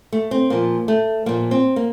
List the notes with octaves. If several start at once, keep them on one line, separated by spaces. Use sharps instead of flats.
A3
C4
A#2 F3 A#3
A3
A#2 F3 A#3
C4
A#3